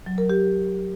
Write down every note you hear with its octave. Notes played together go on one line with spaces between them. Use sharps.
F#3
A#4
G4